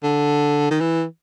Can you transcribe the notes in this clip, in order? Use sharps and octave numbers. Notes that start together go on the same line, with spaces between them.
D3
D#3
E3